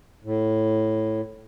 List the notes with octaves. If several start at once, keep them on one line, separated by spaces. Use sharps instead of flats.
A2